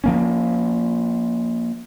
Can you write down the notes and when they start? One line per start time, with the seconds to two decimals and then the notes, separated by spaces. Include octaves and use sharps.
0.04 F3 A#3 C#4